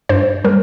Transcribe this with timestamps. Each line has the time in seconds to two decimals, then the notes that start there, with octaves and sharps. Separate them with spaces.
0.09 G2 C5
0.44 G3 A#4